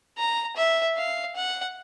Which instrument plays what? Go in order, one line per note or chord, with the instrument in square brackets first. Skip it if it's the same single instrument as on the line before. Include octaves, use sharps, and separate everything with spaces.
[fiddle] A#5
E5
F5
F#5